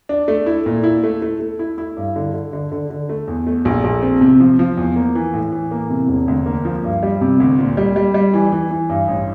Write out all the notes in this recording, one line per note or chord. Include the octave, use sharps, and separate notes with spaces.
D4
A3
E4
A#2
E4
A3
A3
A3
E4
E4
G2
D3
D3
D3
D3
D3
A3
E2
A3
A#1
A#1
C4
C3
F3
F3
E2
A#3
E3
A2
E3
A#3
C3
E1
D2
A#3
F3
G2
G3
C3
D2
A#2
G3
G3
G3
E3
E3
E3
G2
A1